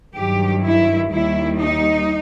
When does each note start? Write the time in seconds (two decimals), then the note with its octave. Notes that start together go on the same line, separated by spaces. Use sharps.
0.16 G2 D#3 F#3 G4
0.64 E4
1.11 D#2 D#3 G3 E4
1.59 D#4